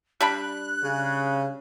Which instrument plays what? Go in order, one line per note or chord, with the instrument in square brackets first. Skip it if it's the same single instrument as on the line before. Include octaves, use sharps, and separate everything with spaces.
[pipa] G3 D4 B5 [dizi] F#6
[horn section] C#3